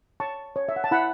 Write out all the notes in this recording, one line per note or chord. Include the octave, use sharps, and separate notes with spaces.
C#5 A5 C#6
C#5
E5
F#5
A5
E4 F#5 B5